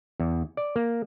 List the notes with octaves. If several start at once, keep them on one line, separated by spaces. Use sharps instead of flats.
E2
D5
A#3